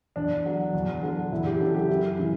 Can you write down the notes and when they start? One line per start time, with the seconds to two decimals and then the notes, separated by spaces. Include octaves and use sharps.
0.16 E2 D4
0.46 D3 F#3
0.73 E2
1.03 D3 F#3
1.32 E2 E4
1.46 G4
1.60 C#3 F#3 A4
1.75 G4
1.89 F#2 E4
2.19 C#3 E3